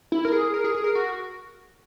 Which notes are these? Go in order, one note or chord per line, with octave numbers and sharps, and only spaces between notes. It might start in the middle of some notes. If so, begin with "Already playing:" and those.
E4
A#4
G#4
A#4
G#4
G#4
A#4
F#4